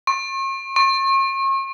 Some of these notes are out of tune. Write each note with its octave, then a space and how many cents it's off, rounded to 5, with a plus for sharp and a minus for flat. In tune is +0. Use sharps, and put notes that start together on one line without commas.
C#6 -45
C#6 -40